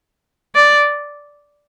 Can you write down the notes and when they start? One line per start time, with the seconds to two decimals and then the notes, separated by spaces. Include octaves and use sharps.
0.55 D5